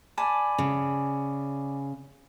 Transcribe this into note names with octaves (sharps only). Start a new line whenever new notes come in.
D5 G#5 A5 B5
C#3